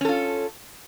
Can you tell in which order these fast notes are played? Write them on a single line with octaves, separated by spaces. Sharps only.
C#4 A4 F4